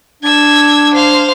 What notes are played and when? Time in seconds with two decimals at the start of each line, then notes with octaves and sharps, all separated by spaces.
0.23 D4 E6 G#6
0.94 C5 F5